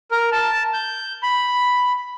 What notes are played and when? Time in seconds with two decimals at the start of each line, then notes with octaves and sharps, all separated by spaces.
0.11 A#4
0.32 A5
0.74 G6
1.23 B5